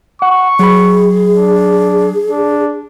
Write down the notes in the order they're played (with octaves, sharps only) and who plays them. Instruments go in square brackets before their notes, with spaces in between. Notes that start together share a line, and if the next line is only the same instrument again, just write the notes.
[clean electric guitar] F#5 [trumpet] C#6
[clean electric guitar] F#3 B5 [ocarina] G#4
[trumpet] D4
D4